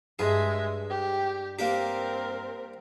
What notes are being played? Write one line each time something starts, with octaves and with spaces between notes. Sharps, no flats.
G2 G#3 G#4 E5
G4
A#3 C4 D4 G4 A#4